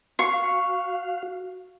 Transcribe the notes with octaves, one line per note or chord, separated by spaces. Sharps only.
F#4 F5 C#6